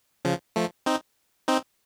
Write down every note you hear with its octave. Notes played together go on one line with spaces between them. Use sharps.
C#3 F3
F3 A3
C4 D#4
C4 D#4